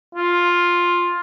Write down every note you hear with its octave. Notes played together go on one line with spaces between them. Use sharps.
F4